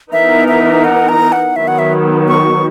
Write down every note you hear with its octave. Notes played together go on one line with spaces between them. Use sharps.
E3 B3 D#4 A#4 E5
E5
F#5
A#5
F#5
D#3 F#3 B3 E5
F#5
E5
C#6